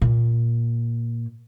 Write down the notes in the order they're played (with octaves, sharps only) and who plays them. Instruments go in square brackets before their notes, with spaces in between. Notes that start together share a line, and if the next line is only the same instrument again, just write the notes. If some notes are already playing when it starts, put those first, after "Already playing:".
[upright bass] A#2